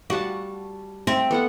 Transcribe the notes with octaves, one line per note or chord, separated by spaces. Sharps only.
G3 F#4 A5
C4 E5
B3 A4 F#5